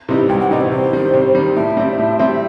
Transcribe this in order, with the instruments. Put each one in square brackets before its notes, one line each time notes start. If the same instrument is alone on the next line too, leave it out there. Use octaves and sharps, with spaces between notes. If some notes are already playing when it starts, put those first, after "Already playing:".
[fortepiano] C3 E3 G3 D#4
[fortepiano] C2 [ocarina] G5
[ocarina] F#5
[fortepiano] C3 E3 G3 D#4 [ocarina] D#5
[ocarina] C5
[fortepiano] C3 [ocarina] C5
[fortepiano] D#3 G3
C3
D#3 G3
[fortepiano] A2 [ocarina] E5
[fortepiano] G3 C4
A2
G3 C4